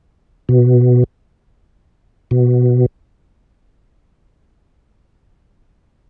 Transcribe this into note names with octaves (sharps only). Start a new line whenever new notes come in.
B2
B2